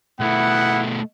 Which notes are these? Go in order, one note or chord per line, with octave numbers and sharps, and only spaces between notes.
B2 A3 B3 E4 F#5